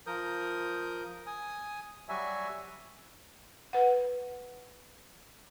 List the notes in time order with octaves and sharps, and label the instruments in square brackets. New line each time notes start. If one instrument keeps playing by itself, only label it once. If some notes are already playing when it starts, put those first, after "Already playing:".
[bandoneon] F3 A#4 D#6 G6
G#5 D#6
F#3 G3 F#4 E5 G#5
[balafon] B4 F#5